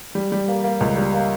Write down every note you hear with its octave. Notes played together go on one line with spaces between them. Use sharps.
G3
G3
A#3
A#3
C#2
G3
A#3